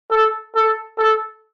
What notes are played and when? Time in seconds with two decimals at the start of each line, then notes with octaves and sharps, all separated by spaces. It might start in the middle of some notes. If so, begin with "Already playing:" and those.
0.11 A4
0.55 A4
0.99 A4